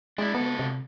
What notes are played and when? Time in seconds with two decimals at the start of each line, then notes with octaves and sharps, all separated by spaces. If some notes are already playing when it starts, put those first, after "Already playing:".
0.18 G#3 D4 E4
0.35 C#2 B3 A4
0.59 C3